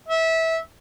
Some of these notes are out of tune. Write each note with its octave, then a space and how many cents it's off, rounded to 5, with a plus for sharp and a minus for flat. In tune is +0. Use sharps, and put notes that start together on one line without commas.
E5 -20